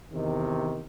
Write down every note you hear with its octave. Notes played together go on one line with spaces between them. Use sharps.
E2 C3 D#3